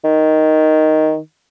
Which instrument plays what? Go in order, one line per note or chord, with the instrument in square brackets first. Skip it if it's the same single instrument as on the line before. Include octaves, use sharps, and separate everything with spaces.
[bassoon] D#3